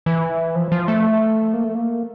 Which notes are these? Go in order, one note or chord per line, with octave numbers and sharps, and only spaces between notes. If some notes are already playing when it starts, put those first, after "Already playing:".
E3
F3
F3
A3
A#3
A3
A#3